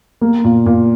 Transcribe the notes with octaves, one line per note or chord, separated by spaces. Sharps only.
A#3
A#2
A#2